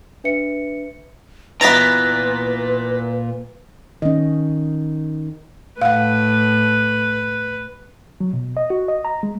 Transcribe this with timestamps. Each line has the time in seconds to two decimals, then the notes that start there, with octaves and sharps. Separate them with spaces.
0.24 D4 B4 E5 C#7
1.61 A#2 E3 B3 B4 A#5 A6 B6
4.02 D#3 C#4 D#5
5.82 A2 B4 F5 F#5
8.20 F#3
8.33 B2
8.57 D#5
8.70 F#4
8.88 D#5
9.05 A#5
9.23 G#3